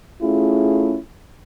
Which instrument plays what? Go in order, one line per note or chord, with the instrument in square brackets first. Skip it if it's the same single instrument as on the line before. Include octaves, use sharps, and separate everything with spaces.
[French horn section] A3 C#4 E4 F4 G#4